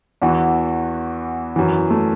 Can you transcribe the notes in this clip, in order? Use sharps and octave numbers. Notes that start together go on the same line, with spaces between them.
E2 E3 F#4
F#2 E3
A3